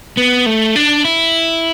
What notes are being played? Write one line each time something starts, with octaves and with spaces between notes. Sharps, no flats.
B3
A3
D4
E4